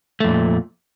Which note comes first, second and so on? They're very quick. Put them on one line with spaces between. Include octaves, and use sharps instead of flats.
A3 F2 A#2